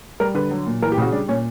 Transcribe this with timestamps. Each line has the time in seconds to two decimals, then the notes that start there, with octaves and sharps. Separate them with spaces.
0.20 G3 A#4
0.35 D3 B4
0.51 F#3
0.66 A#2
0.82 E3 A#4
0.92 G4
0.98 C#3 F#4
1.12 G3 D4
1.28 A#2 C#4